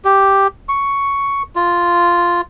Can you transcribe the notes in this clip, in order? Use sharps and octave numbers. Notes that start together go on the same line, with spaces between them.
G4
C#6
F4